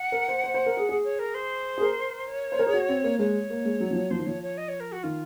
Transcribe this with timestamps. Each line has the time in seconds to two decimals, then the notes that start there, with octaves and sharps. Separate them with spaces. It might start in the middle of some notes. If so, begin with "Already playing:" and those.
Already playing: F#5
0.12 A#4
0.28 C5
0.44 C5
0.54 C5
0.66 A#4
0.77 G#4
0.89 G#4
1.04 C#5
1.19 A#4
1.35 C5
1.78 G#4
1.81 A#4
2.28 C#5
2.52 C5
2.59 A#4
2.66 G#4
2.73 F#4
2.89 C4
3.04 A#3
3.19 G#3 C#5
3.50 A#3
3.65 G#3
3.80 F#3
3.91 F3
3.95 F#3
4.11 F3 C5
4.18 D#3
4.26 F3 C#5
4.43 C#5
4.58 D#5
4.69 C#5
4.80 A#4
4.92 F#4
5.03 D#3 F4